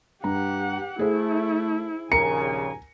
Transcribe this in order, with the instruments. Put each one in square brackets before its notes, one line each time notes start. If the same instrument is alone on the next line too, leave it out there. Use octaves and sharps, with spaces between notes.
[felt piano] G2 A#5 [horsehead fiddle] G4 F#5
[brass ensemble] A3 [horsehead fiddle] E4 [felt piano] G#4 C5
[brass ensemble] A#1 D#2 C#3 [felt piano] A#4 A#5 [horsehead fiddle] G#5 [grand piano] C#7